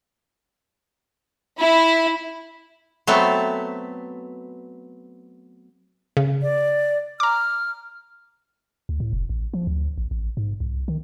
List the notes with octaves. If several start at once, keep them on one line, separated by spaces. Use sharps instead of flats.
E4
F#3 A3 B3 C4
C#3
D5
A#5 D6 F6
D2
A2
F1
A1
F3
D2
A1
A1
G#2
C2
D#3